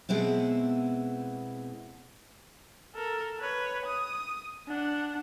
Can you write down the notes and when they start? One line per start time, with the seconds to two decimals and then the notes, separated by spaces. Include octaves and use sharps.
0.09 B2 G#3 B3 C4 E4
2.95 A4 A#4
3.40 B4 C#5
3.86 D#6
4.68 D4 F#5